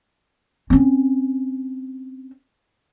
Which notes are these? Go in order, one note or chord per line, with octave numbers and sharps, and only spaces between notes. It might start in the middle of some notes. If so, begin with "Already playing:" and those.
C4 C#4